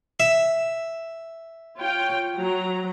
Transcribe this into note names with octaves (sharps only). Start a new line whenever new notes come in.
E5
F4 C#5 G5
F#3 A#5